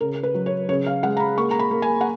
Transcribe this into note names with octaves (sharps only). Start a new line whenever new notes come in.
C#3 A#4
B4
F#3
C#5
C#3 C#5
F5
G#3 F#5
A#5
B5
A#3 C#6
A#5
B5
A#3
G#5
F#5